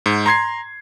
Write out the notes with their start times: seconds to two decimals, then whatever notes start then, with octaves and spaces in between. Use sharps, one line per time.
0.06 G#2
0.26 A#5 C6 G#6 C7